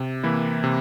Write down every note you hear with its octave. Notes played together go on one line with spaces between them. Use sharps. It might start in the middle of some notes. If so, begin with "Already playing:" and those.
Already playing: C3
E3 A#3 E4
C3